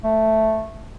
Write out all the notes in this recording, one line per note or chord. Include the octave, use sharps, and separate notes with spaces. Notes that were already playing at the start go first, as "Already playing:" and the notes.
A3